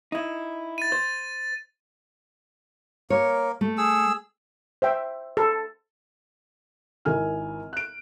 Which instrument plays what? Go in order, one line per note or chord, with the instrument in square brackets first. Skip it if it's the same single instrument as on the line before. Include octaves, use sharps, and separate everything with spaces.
[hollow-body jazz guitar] D#4 E4
[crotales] A6 D#7
[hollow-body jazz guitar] C5
[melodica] A#3 A#4 [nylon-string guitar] C#5
[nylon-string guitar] A3
[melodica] G#4 E6
[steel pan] C5 E5 G5
A4
[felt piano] G#1 E4 A#4 G#5 F6
F#6 D7